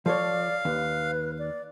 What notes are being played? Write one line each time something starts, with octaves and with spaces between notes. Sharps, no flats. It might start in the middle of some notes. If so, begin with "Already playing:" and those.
F3 A4 C#5 D5 F5
D#2 B4
D5